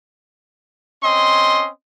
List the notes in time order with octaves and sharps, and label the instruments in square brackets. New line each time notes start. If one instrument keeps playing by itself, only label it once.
[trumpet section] C4 C#4 D#5 C6